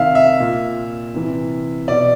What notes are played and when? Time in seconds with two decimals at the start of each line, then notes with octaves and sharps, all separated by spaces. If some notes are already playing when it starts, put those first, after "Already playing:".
Already playing: C3 D#3 E5 F5
0.15 E5
0.40 A#2
1.14 C3 E3
1.88 B2 D5